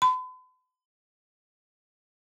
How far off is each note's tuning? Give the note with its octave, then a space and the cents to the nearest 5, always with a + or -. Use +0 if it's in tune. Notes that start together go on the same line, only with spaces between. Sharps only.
B5 +45